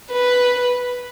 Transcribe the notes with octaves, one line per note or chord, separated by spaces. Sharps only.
B4